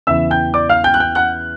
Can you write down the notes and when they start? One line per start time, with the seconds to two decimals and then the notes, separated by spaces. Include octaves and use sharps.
0.07 E2 C#3 E3 E5 E6
0.31 G5 G6
0.54 D5 D6
0.69 F5 F6
0.84 G5 G6
0.94 F#6
1.00 G5 G6
1.15 F#5 F#6